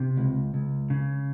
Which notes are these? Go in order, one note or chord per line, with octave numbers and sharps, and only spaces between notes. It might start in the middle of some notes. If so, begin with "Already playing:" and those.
Already playing: C3
C#2
C#2
C#3